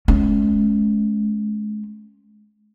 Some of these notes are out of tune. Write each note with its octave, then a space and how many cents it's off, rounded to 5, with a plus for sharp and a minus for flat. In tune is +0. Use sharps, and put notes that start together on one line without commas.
G#3 +35 C#4 +0